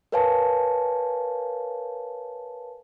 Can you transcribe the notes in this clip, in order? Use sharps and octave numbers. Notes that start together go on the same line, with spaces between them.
A#4 B4 C#5 F5 G#5 A5